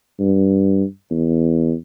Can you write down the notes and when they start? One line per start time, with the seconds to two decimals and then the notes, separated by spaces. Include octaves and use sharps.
0.20 G2
1.11 E2